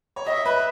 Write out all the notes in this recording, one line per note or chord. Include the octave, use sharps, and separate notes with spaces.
C#5
D#5 E5
B4